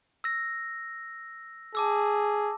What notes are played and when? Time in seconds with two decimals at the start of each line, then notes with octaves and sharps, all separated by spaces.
0.24 E6 A#6
1.75 G#4 A5 D6 E6